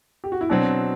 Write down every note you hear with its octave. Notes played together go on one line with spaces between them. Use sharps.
G4
F#4
E4
B2 F#3 C4 D4